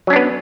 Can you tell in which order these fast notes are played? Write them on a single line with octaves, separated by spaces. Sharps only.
F#3 C#4 D4 B3